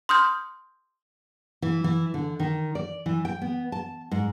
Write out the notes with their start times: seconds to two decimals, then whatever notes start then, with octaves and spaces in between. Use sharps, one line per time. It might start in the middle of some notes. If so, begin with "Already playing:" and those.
0.09 C6 D#6 F6 G6
1.62 E3
1.84 E3
2.14 D3
2.40 D#3
2.75 D5
3.06 E3
3.25 G5
3.42 B3
3.72 A5
4.11 G#2